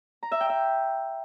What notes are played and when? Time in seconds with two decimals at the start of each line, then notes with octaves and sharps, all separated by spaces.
0.23 A#5
0.32 E5
0.40 G5
0.49 E5